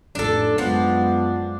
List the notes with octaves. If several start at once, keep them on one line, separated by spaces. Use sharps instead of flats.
A1 F2 D4 A4
F#2 F3 G#3 B3 D4